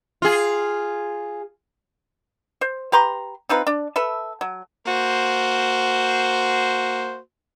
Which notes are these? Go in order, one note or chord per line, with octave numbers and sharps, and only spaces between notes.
F4 G#4
C5
G4 B4 A#5 C6
C4 D#4 F4 B4
D4
A4 B4 E5
F#3
A#3 F#4 C5